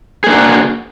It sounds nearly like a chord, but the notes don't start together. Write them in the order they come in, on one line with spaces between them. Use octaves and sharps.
G#4 A#3 D4 F#4